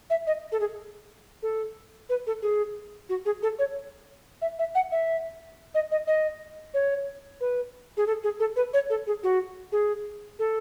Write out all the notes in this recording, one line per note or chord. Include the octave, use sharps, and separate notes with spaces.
E5
D#5
A4
G#4
A4
B4
A4
G#4
F#4
G#4
A4
C#5
E5
E5
F#5
E5
D#5
D#5
D#5
C#5
B4
G#4
A4
G#4
A4
B4
C#5
A4
G#4
F#4
G#4
A4